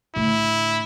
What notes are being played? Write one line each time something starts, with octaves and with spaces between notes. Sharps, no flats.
A2 D3 E4